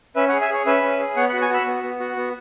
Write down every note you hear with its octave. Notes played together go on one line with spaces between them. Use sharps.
C#4 B4 E5
C#5 F#5
G#4
E5 G#5
G#4 C#5
C#4 B4 E5
C#4
G#4
B3 C#5 F#5
F#5 B5
F#4
G#5 C#6
F#4 B5 E6
B3
B3
F#4
B3